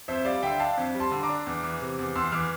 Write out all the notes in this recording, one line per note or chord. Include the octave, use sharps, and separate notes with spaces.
F2 C5 E5
G3 D5 F5
D3 E5 G5
D4 F5 A5
F2
G3
A5 C6
D3
A#5 D6
D4
E2
E3
C3
E2
E2 C6 E6
E3 D6 F6